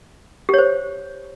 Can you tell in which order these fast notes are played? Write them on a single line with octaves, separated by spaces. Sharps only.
G4 C#5 C5